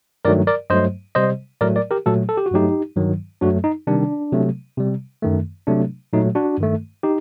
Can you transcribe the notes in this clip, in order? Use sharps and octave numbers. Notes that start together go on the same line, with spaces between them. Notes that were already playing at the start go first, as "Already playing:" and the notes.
G2 D#3 F#3 A3 A#4 D5
A#4 D5
G2 F#3 A3 C5 D#5
C3 G3 C5 D#5
A2 F#3 A3 A#4 D5
A#4 D5
G4 A#4
A#2 F#3 A3 F#4 A4
A4
G4
F#4
G2 F#3 A3 D#4 G4
G2 D#3 F#3
F#2 F#3 A3 D4 F#4
D#4
C3 D#3 G3 D4
C3 F#3 A3
C3 G3
F#2 D#3 A3
C3 F#3 A3 D4
A#2 F#3 A3 D#4
D4 F#4
G2 D#3 A3
D#4 G4